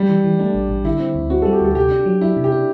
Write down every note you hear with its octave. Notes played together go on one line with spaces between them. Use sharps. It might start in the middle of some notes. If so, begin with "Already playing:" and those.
Already playing: G3
E3
E3
A3 D4
A1
A1
D3 E4
C4
D2
C4 F#4
G3 A4
G4
D2 A4
C3 G4
D4
F#3
D4 E4
C3
G4
D4